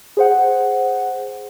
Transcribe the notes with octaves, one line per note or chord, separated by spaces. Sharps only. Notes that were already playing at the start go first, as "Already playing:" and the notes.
G#4 C5 F#5